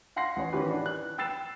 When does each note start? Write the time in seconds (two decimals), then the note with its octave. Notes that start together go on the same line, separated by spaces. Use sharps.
0.16 F5 F#5 C6 A#6 C7
0.36 A1 C#5
0.53 D#3 E3 C#4 F#4 G4 B4
0.70 D4
0.86 F#6
1.18 G5 E6 A6 C7 E7